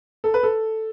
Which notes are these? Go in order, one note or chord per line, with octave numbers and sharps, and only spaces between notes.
A4
B4
A4